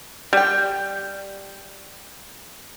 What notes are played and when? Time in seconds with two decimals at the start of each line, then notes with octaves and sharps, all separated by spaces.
0.33 G3 G5